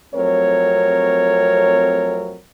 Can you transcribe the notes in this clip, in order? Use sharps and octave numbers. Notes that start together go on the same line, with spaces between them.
F2 F#3 A3 C4 A#4 C#5